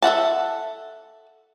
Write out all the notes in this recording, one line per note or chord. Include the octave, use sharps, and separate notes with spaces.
A4 E5 F#5 A5